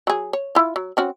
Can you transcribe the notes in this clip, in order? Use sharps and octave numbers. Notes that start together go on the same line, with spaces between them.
F#3 G#4
C#5
E4 F4
F#3
C4 C#4 F#4